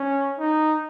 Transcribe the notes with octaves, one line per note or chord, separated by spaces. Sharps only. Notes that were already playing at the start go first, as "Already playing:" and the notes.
Already playing: C#4
D#4